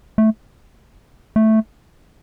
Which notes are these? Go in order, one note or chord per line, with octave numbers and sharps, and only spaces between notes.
A3
A3